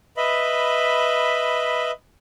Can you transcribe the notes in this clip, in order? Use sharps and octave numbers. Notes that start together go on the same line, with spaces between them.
B4 D#5 E5 B5